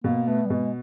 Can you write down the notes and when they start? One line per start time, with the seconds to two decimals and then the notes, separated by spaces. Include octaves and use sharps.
0.04 B2 A#3
0.27 A3 B3
0.46 G3
0.50 B2 G#3